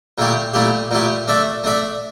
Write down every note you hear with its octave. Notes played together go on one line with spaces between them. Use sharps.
A#2 A3 E4 G4
A#2 A3 E4 G4
A#2 A3 E4 G4
A3 D4 A4 E5
A3 D4 A4 E5